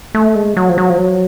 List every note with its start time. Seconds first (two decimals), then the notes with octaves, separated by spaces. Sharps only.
0.15 A3
0.35 G#3
0.57 F#3
0.69 F3
0.78 F#3
0.90 F3
0.97 F#3